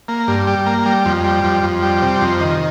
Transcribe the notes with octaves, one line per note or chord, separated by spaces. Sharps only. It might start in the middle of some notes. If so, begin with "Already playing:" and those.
A#3
G2
G3
A#3
G3
F2
G3
F2
F2
G3
C3
F2
D#3